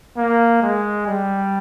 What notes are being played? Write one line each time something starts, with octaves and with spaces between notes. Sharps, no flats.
A#3
G#3
G3